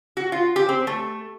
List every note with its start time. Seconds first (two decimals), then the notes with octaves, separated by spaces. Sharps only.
0.17 F#4
0.32 F4
0.56 G4
0.69 C4
0.87 A3